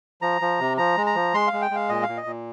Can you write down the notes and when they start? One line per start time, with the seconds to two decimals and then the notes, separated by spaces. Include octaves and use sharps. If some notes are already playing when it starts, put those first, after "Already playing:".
0.22 F3 A#5
0.41 F3
0.60 C3
0.77 F3 A#5
0.97 G#3
1.06 A#5
1.15 F3
1.34 G#3 C6
1.47 F5
1.53 G#3
1.61 G5
1.71 G#3 F5
1.89 A#2 D#5
2.03 F5
2.09 A#2
2.17 D#5
2.26 A#2